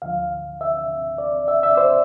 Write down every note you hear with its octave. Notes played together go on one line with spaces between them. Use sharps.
D2 D3 F3 F5
E5
D5
E5
E5
D5
C5